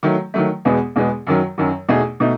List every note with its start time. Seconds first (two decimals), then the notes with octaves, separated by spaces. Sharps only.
0.03 D#3 F#3 A3
0.34 D#3 F#3 A3
0.65 E2 B2 G#3 B3
0.96 E2 B2 G#3 B3
1.27 F#2 D#3 F#3
1.58 F#2 D#3 F#3
1.89 E2 B2 A3 D#4 G#4
2.20 B2 A3 D#4